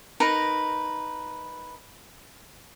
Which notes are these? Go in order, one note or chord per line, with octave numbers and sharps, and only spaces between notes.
D#4 A#4 B4 A#5